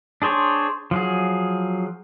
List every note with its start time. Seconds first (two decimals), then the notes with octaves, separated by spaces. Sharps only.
0.22 D4 G#4 C5 C#5
0.91 F3 F#3 G#4